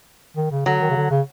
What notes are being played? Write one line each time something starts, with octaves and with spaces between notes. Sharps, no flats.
D#3
C#3
D3 F#3
D#3
C#3
D3
C#3